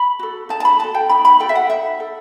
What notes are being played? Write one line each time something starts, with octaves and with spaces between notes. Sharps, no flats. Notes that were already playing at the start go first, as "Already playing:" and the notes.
Already playing: B5
F#4 A4
D#4 A5
A5
B5
F#4 A4 A5
G5
D#4 B5
B5
F#4 A4 G5
E5
F#5
D#4 E5
A4